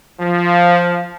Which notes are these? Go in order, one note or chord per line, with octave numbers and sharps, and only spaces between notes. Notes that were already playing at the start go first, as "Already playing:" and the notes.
F3